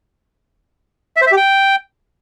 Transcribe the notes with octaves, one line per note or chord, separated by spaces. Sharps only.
E5
C5
E5
G4
G5